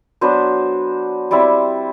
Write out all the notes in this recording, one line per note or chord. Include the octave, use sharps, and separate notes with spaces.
F#3 B3 D4 C5
G3 C4 E4 D5